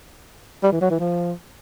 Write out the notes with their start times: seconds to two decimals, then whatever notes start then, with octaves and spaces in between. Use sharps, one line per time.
0.63 G3
0.72 E3
0.81 F#3
0.90 E3
0.99 F3